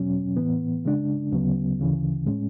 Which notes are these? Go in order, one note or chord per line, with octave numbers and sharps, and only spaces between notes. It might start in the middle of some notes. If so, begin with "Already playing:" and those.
Already playing: E2 B2 F#3 C#4
A2 E3 B3
C#3 G#3 D4
D2 C#3 F#3 B3
D2 C#3 E3
A2 G#3 C#4